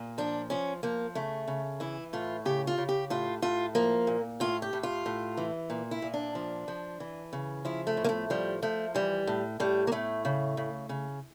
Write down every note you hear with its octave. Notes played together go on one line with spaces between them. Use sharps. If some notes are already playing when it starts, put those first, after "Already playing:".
Already playing: A#2
F3 D4
F3 C#4
F3 A#3
C#3 A3
C#3
E3 E4
A2 F4
C#3 G4
F4
C#3
G4
A2 F4
A2 F4
F3 A#3
A#2
A2 F4
G4
A2
F4
A2
E3
A#2
E4
A#2
D4
F3
F3
E3
C#3
F3 E4
A3
A2
A#3
A3
F3 G3
F3 A3
E3 G3
A2
A2 G3
A#3
A2 A3
C#3
C#3
C#3